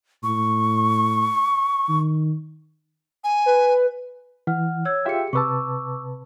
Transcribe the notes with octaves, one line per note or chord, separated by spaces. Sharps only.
A2 C#6
D#3
G#5
B4
E3 F#5 F6
C#5 E6 G#6
F4 G4 G#4 E5 G5 C#7
C3 B4 A5 C#6 D6 E6